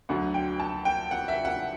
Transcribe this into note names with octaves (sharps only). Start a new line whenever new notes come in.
D2 D3 F#3 F#5
G5
A5
G5
F#5
E5
F#5